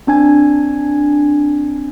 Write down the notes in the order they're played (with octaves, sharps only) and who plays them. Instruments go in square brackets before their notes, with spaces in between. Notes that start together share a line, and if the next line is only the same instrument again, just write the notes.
[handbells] C4 D4 G#5 G#6